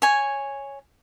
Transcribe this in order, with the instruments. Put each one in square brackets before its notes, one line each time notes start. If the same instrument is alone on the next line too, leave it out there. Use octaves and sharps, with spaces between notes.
[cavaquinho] C#5 G#5